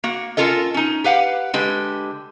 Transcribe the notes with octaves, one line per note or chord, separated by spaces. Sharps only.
A#3 F#4
C#4 F4 A4 A#4 D#5
C#4 D#4
G4 B4 F5 F#5
D3 G#3 G4 B4